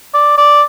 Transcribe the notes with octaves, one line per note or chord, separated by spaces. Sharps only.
D5
D5